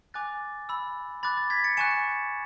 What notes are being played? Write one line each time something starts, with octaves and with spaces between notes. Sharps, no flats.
G#5 D6 F#6 A6
B5 E6
B5 D6 F#6 A6
A6
G#6 B6
A6 C#7
G#5 C#6 F#6 C#7 E7